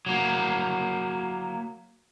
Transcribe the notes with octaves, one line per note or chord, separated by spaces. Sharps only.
F#3 A#3